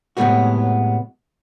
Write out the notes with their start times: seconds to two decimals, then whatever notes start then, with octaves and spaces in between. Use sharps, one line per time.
0.17 A2 C3 F#3 G#3 B3 F#4